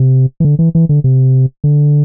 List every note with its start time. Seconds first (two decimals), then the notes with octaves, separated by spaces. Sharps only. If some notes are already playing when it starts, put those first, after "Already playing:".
Already playing: C3
0.40 E3
0.45 D3
0.59 E3
0.75 E3
0.89 D3
1.04 C3
1.64 D3